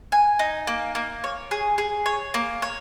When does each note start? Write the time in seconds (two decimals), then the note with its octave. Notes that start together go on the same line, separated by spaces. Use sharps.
0.12 G#5
0.39 D#4
0.67 A#3
0.95 A#3
1.24 C#5
1.51 G#4
1.78 G#4
2.06 C#5
2.34 A#3
2.62 C#5